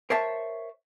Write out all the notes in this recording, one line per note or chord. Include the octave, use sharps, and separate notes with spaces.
A#4 C5 C#5 E5 A5